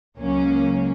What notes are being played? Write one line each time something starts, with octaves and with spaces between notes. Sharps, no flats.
C#2 C#3 F#3 A#3 C#4